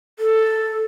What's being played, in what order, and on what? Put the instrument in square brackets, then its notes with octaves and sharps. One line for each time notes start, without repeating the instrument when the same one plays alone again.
[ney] A4